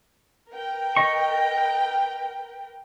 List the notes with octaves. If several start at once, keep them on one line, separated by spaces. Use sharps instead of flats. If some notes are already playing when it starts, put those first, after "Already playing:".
A#4 B4 G5
D#5 C#6